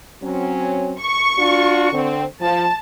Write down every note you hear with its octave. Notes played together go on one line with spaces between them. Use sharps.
F#3 C4 C#4
C#6
D4 F4 F#4
D3 C4
F3 A5